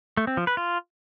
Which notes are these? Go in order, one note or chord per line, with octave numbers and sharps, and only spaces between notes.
A3
C4
F3
B4
F4